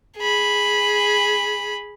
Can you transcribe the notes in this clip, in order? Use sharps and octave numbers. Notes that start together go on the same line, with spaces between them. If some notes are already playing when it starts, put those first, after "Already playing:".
G#4 B5